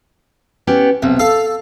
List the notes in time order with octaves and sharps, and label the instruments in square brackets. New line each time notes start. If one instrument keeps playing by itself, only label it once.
[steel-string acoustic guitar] B3 C#4 G4
[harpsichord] B1 [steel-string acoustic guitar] C3
[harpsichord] A4 [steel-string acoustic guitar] F5